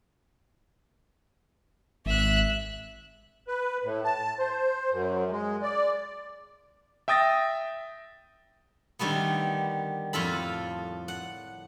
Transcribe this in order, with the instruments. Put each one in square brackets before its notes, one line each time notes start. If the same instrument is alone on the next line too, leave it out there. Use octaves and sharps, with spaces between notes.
[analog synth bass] G#1 [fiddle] E5 F#6
[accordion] B4
A2
A5
C5
F#2
G#3
D5
[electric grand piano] E5 G5 D#6 A6 A#6
[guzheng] D3 D#3 G3 A3 B3
F2 A2 F4 A4 B5
F#5